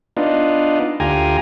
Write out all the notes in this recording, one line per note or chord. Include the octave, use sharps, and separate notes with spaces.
B3 D4 D#4 F4
D2 F4 G4 G#5 A#5